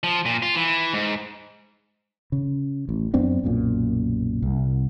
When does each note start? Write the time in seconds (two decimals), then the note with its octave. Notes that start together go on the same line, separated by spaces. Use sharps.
0.03 F3
0.26 A#2
0.42 F4
0.55 E3
0.94 G#2
2.32 C#3
2.89 A1
3.14 F#2 B3 C4 D4
3.43 B1 F#2 A#2
4.42 C2